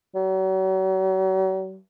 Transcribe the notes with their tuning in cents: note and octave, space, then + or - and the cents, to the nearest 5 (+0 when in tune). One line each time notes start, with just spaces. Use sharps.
F#3 +40